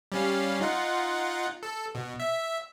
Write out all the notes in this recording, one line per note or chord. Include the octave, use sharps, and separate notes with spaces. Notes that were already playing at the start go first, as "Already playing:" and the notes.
G3 C#4 F5
D#4 F4 F#5
A4
B2
E5